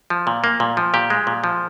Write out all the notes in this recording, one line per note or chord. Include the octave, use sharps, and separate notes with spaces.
F3
A#2
A#3
A#2
F3
A#2 G4
G#3
A#2
F3